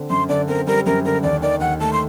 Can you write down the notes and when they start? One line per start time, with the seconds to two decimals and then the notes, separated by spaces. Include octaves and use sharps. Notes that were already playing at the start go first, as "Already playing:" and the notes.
Already playing: D3 C4
0.10 F#2 C6
0.29 D3 D5
0.48 C4 A#4
0.67 G3 A#4
0.86 F#2 A#4
1.05 D3 A#4
1.23 D#2 D5
1.42 D#3 D5
1.60 D#2 F#5
1.80 A3 A5
1.93 C6